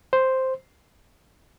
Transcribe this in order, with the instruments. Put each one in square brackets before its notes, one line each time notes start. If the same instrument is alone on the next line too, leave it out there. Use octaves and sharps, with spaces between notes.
[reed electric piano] C5